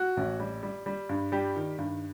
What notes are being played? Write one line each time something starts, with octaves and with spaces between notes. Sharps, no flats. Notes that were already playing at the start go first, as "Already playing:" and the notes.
Already playing: F#4
A1
G3
G3
G3
G2
G3 G4
D#3
G2